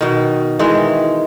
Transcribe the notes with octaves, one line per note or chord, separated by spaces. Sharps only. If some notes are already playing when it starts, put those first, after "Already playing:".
B2 D#3
D#3 E3 G#3